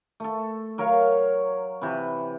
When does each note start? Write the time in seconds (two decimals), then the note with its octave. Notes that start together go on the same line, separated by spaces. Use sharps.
0.20 A3 A4
0.78 F#3 A#4 C#5 F5
1.81 C3 E3 B4